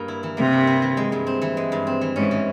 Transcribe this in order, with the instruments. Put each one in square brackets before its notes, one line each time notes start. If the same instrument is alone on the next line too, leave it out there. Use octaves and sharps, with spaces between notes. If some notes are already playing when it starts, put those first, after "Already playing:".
Already playing: [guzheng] G2 A#3
E4
E3
[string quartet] C3 [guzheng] A#3
[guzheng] G2
E4
E3
G#3
G2
C4
E3
G#3
G2
C4
E3
[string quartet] G#2 [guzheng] C#4
[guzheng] E3